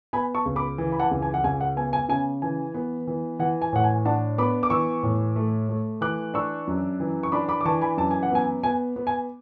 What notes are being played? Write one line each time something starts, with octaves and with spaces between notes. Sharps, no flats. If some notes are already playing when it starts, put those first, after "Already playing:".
B3 G#5 B5
A5 C#6
C#2
B5 D6
E3
B5
F#5 A5
C#2
G#5
F#5
C#2 G#5
F#5
B3 G#5
G#5
C#3 G#5
E3 G#5
B3
E3
E3 F#5
G#5
A2 F#5
G#5
D4 F#5 A5
B3 B5 D6
D6
E3 C#6 E6
A2
A3
A3
E3 D6 F#6
D4 C#6 E6
F#2
E3
C#6
D4 B5 D6
B5 D6
D6
E3 A5 C#6
G#5 B5
F#2 A5
G#5
F#5
B3 G#5
B3 G#5
B3
G#5